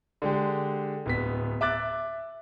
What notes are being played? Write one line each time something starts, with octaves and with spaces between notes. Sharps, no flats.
D3 G#3 G4
D1 B3 B6
E5 D6 F#6 A6